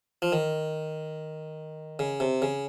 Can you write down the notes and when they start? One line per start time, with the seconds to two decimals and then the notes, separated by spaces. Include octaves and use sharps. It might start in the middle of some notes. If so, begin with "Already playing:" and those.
0.22 F3
0.32 D#3
1.99 C#3
2.20 C3
2.42 C#3